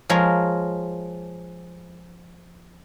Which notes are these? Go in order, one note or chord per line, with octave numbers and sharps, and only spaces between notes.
F3 G#3 A#4 C#5